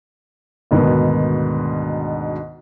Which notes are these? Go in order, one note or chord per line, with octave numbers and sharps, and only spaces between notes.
D2 G#2 B2 D#3 B3